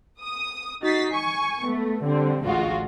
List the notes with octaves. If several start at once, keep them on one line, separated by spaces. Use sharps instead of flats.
D#6
D#4 F#4 A6 B6 C7
G#5 C#6
A3 B3
D3 G3 C4
A1 D2 G#3 F4 F#4